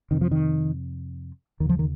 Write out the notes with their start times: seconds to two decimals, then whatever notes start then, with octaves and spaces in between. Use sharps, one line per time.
0.11 F2 C3 D#3
0.21 F3
0.31 D#3
1.60 D#2 D#3
1.65 C#3 F3
1.79 D#3